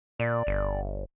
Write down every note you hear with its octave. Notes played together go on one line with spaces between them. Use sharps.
A#2 D5
G1